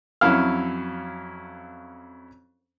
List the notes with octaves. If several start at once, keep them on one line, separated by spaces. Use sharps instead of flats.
F2 F#3 C#4 E4 F5 F6